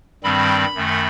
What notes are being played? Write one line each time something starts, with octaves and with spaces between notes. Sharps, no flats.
G2 D#3 G3 C4 B5
F#2 D#3 A3